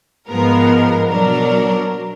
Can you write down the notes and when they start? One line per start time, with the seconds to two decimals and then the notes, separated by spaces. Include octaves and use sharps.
0.28 G#2 F3 G#3 B3 A#4
1.08 B2 F#3 D4 A#4